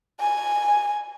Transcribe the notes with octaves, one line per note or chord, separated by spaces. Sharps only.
G#5